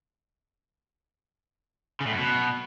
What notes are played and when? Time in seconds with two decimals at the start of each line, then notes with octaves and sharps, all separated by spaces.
2.01 C#3
2.07 A2
2.13 F#2
2.19 B2